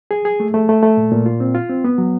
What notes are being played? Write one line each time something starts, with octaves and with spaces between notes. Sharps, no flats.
G#4
G#4
A3
A3
A3
A3
A#2
A#2
F4
C4
F4
C4
B3
F#3